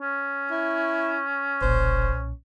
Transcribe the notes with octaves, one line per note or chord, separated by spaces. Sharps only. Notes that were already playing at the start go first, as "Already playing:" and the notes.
C#4
E4
F1 B1 A#2 C5